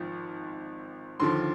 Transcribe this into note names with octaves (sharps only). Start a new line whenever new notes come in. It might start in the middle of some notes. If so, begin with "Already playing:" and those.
Already playing: G#1 G#2 F3
D#2 D3 F3 C6